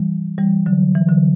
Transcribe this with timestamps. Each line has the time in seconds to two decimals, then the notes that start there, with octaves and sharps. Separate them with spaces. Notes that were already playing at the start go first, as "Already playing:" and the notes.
Already playing: E3 G3
0.38 E3 G3
0.66 D3 F#3
0.95 E3
1.09 D3 F#3